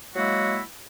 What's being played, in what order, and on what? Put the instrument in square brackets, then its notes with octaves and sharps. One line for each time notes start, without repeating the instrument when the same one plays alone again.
[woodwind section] F#3 G#3 A#3 E4 F#4